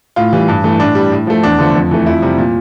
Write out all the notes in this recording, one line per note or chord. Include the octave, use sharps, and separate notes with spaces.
A2 F4
E3 G3
G2
E3 A3
A2 D4
G3
A2
F3 A3
E2 D4
D3 F3 A3
F2
E3 A3
F2 E4
C3 G3
A#2